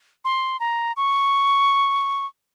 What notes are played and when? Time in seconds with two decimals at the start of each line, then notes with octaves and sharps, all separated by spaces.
0.25 C6
0.60 A#5
0.97 C#6